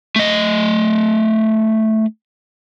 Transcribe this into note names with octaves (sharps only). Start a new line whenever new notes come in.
A3 D#5